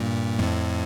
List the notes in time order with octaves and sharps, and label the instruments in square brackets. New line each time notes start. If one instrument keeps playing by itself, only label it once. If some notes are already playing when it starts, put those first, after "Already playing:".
Already playing: [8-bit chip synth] G2 A#2
F2 A2